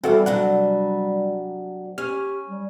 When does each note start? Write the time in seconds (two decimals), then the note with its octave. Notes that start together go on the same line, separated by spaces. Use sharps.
0.04 E3 G3 C4 F#4 A4 F5
0.26 C3 F#3 D4 F#5
1.98 C#4 G4 F6
2.50 G3